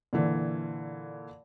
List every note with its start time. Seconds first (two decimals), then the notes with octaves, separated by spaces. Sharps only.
0.13 A#2 D3 E3